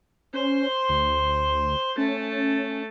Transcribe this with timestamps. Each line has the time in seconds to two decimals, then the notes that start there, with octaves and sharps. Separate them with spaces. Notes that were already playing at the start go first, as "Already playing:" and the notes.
0.34 C#4 C5 C6
0.89 D2
1.98 A3 C#4 A5